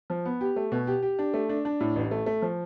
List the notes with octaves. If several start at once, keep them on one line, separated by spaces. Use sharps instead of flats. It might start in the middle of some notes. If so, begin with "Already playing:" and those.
F3
B3
G4
A3
B2
G4
G4
D4
A3
D4
D4
A2
A1
A3
A3
F3